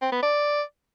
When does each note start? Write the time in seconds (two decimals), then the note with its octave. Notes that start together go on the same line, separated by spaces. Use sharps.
0.02 C4
0.12 B3
0.23 D5